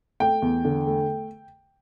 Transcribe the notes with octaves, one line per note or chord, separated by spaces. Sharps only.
A3 G5
E2
D3
A3